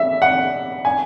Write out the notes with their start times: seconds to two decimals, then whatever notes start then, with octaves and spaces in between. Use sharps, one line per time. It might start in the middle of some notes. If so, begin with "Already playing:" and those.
Already playing: E5
0.22 F#5
0.85 G#5